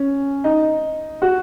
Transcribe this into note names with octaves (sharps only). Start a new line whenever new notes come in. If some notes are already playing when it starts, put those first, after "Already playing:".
Already playing: C#4
D#4
F#4